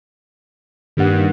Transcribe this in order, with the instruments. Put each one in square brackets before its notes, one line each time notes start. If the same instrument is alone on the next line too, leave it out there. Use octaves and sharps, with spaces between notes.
[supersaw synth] G2 [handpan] D#3 A#3 F#5